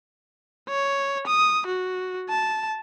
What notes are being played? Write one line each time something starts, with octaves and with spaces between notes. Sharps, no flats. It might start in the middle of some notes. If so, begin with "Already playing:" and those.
C#5
D#6
F#4
A5